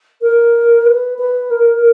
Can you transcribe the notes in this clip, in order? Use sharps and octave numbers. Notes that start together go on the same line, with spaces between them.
A#4
B4
B4
A#4